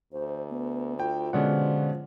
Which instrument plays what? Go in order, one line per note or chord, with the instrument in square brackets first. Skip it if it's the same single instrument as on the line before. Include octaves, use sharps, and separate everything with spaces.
[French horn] D2 [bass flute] C5
[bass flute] B3
[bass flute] F4 [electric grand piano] G5
[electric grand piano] B2 G#3 C#4 [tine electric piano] D3 D5 F#5 [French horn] F3